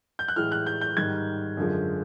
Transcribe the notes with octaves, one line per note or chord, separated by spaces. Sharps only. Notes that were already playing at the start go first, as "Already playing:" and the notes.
G6
F#6
A2 E3 G#3 F6
F#6
G6
G6
G#2 D#3 G3 G#6
F#2 D3 F3 G#3